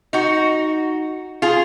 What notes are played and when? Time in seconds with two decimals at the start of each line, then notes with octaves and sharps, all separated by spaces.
0.13 D#4 F#4
1.42 F4 G#4